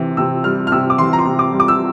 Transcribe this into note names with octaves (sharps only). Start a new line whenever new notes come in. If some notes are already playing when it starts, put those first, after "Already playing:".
Already playing: C3 E3
C3 E6
G3 F6
F6
C3 E6
D6
E3 C6
A#5
C6
C3
D6
G3
D6
E6